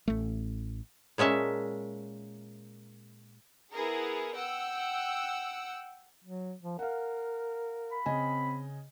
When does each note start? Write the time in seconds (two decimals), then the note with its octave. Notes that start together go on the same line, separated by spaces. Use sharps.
0.08 A1 A3
1.18 A#2 G#3 C#4 E5 A5
3.72 B3 E4 G#4 A#4
4.33 F#5 G5 E6
6.24 F#3
6.63 F3
6.79 A#4 F5 F#5
7.92 B5
8.06 C#3 C4 D#5 G#5